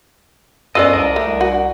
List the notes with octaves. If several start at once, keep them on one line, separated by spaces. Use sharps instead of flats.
F#2 F3 G#3 B3 A4 D5 D#5
C2 D4 A#4 D#5
C2 A3
F#4